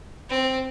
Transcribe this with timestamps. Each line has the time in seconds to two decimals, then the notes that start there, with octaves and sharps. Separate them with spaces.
0.29 C4